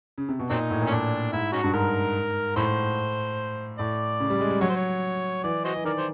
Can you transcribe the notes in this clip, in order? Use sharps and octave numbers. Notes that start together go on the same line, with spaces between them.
C#3
C3
B2
A#2 F#3 C4 D#4
A2
A#2
C#4
A2 D4
G#2 E4
C#4 D#4 F#4
G2
G#2 A#4
A2 E4 C5
A2 D5
C#3
G3
G#3
G3
F#3 C#5
C5
C#5
E3 D5
F#4 C5 D#5
E3
D#3 A#4 D5
C5